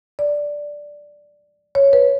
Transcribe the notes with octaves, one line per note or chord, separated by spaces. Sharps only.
D5
C#5
B4